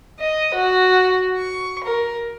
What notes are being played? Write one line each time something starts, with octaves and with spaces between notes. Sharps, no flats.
D#5
F#4
C#6
A#4